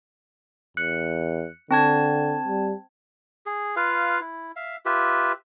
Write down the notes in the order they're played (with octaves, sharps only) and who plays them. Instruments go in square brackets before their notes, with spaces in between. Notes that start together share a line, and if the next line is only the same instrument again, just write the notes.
[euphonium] E2 [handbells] F#6 C#7
[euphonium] D3 [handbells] C4 A5 G#6
[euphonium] G3
[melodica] G#4
F4 B4 F5
E4
E5 F5
F4 G4 B4 E5